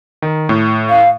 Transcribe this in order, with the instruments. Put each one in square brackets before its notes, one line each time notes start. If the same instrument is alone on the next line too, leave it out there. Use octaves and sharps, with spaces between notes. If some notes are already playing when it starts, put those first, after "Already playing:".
[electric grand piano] D#3
A2
[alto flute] F5